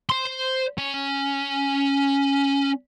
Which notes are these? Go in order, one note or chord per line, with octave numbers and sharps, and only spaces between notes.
C5 C6
C#4